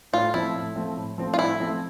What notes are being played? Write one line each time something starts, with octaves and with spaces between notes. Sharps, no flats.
A2 F4
F3 A3 C4 E4
A2
F3 A3 C4
A2
F3 A3 C4
F4
A2 E4
F3 A3 C4